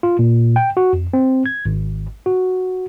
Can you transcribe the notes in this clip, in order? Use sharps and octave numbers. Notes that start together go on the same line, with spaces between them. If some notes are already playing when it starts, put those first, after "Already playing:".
F4
A#2
G5
F#4
F2
C4
G#6
G#1
F#4